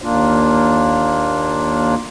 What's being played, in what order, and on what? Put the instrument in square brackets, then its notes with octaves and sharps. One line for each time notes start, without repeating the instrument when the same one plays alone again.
[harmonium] D#2 A#3 D4 F4